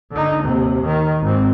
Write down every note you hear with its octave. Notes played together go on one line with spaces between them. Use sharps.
D3 D#4
D#2 C3
D#3
G#1 C4